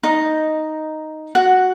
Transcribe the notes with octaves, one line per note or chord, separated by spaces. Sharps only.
D#4 D#5
F#4 F#5